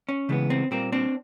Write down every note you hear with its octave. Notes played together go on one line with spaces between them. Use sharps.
C#4
C#3 E3 G#3 B3
C4
A#2 G3 A#3 C4
C4 D4